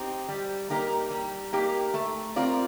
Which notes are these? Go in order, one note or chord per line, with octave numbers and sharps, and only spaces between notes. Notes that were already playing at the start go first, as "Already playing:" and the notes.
Already playing: C4 D#4 G4
G3
A#3 D#4 G4 A#4
G3
A#3 D#4 G4 A#4
A3
C4 F4 A#4 D5